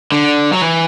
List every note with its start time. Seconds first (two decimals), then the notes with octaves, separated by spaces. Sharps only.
0.12 D3
0.52 F#3
0.61 E3